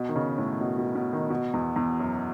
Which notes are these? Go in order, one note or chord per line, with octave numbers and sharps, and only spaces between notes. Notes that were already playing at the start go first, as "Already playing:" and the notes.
Already playing: B2
D#3
C#3
A2
B2
B2
B2
D#3
B2
E2
E2
F#2